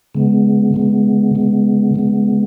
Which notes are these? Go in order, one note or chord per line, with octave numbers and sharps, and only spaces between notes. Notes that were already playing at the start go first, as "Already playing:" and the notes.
C#3 G#3 B3
C#3 G#3 B3
C#3 G#3 B3
C#3 G#3 B3